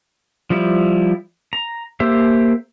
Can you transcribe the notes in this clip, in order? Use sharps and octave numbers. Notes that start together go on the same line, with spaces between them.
F3 G3 E4
A#5
A#3 G4 C5 E5